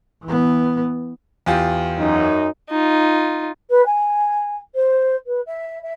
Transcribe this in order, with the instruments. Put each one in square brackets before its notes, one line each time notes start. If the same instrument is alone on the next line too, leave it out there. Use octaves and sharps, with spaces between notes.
[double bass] E3 B3
[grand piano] E2 F4 G4
[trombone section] F#2 D#4
[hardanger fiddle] D#4 F4
[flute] B4
G#5
C5
B4
E5
E5